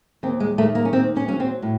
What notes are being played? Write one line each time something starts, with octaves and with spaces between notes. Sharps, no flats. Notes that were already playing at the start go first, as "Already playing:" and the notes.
D#2 C4
G#3
D#3 A3
A#3
C#4
D#2 C4
C#4
F#3 C#4
C4
A2